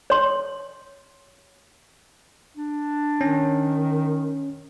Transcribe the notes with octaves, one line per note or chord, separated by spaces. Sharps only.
C#5 C6
D4
D#3 C#4